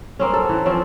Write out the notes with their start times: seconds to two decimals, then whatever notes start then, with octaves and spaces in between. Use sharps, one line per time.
0.19 A#3 C4 C#4
0.33 A4
0.49 E3
0.66 F3 C4 C#4